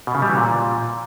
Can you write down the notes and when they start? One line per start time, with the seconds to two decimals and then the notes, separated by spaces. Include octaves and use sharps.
0.07 B2
0.15 C#3
0.22 G3
0.30 E3
0.37 A#2